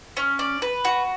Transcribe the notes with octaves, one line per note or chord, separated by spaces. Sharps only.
C#4
D5
B4
F#4